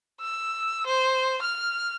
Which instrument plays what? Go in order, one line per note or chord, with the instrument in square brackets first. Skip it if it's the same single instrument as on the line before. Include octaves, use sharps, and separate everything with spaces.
[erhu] E6
C5
F6